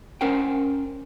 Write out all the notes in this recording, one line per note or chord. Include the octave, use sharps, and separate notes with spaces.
C#4 A#4 C5 F#5 G5